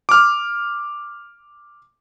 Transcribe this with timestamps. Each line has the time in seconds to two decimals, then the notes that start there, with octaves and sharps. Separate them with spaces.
0.09 D6 F6